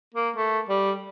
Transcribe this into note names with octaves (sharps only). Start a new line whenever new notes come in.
A#3
A3
G3